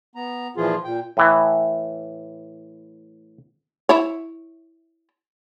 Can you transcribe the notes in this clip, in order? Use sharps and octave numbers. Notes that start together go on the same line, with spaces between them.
B3 A#5
A#2 E3 F3 F4 G#4
A#2 G5
A2 E3
E4 C#5